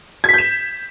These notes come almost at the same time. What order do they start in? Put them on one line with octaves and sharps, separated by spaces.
G#6 B6 G6 E7